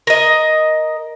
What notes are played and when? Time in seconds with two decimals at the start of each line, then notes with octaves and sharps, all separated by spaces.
0.07 A#4 D#5